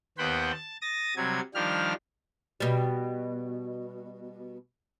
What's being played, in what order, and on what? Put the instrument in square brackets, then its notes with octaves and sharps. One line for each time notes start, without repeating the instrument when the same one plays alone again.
[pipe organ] D#2 B3 C5 F#5 G5 B5
A5
D#6 A6 A#6
C3 F#3 G3 G#6
D#3 F3 G3 D4 G4 F6
[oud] B2 G3